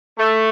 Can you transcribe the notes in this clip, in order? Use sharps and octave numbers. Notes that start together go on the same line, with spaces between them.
A3